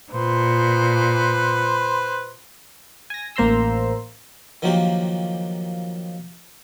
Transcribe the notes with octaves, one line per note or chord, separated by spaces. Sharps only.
A#2 B4 C5
G#5 A#6
A1 A#3 C5 A#5 C6 E6
D#3 F3 F#3 A#3 F#4 G4